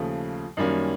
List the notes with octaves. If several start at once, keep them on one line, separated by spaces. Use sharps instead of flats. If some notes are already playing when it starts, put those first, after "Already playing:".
Already playing: D#2 C#3 F3 A3
F#2 D#3 G3 A#3 C#4